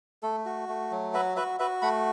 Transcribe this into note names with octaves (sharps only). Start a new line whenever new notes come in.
A3 A4
F#4
A3
F#3
F#4 B4 E5
F#4 B4 E5
F#4 B4 E5
A3 F#5 B5